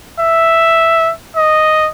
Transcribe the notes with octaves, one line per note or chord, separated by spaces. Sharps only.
E5
D#5